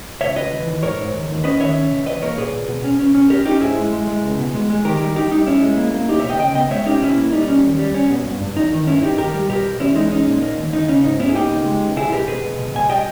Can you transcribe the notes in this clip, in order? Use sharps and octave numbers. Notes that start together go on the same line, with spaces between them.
C#2 C#5 E5
C#2 B4 D#5
E3
D#2
G#2 A#4 C#5
G#2
D#2
D#2
C#4 B4 D#5
D#3 C#5 E5
C#4
B2
E2 B4 D#5
A#3 A#4 C#5
A#2 G#4 B4
A#2
B2
C#4
C#4
C#4
C#4 G4 A#4
C#4 D#4 G4
G#2 E4 G#4
G#3
G#3
G#3
C#2
B2
G#3
G#3
D#3 G4 A#4
G3
G3 D#4 G4
G3 D#4
B1 C#4 E4
G#3
A#3
A#3
B1 D#4 G4
B2 C#5 E5
D#5 G5
C#3 D#5 G5
B3 D#5 G5
G#3 C#5 E5
C#4 D#4 G4
B2 C#4 E4
A#3
G3 D#4
B1 C#4
D#2
G3
C#4
B2
G2
G2
E2 D#4
D#3
G2 C#4 E4
G2 D#4 G4
D#2 G4 A#4
G3
B2 G4 A#4
B2
E2 C#4 E4
G#3 D#4
C#4 D#4
A#2
A#3
D#2
D#2 D#4
C#3 C#4
G#2 D#4
B3 C#4 E4
G#4
A#3 D#4 G4
C#2
G#3
C#2
B1 E4 G#4
B2 G4 A#4
B2 G#4 B4
B2
B2
B2 G#5
G3 D#5 G5